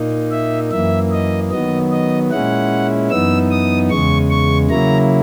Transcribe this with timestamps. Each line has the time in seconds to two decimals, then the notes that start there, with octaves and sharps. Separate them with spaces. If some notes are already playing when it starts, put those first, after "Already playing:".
Already playing: A#2 A#3 D#4
0.31 E5
0.71 F#2 E3 A#3 E5
1.11 D#5
1.51 D#3 F#3 B3 D#5
1.91 D#5
2.31 A#2 G#3 C#4 E4 F#5
3.10 F#2 E3 B3 D#4 E6
3.51 D#6
3.90 E2 C#3 G#3 C#6
4.30 C#6
4.70 C#3 F#3 A#3 E4 A#5